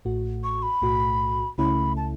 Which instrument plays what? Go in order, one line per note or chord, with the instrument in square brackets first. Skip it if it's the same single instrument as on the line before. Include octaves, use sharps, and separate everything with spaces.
[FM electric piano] A1 A2 A3 F#4
[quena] C#6
B5
[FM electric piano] B1 A2 A3 F#4
[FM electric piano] C#2 C#3 A3 C#4 E4 [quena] B5
[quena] A5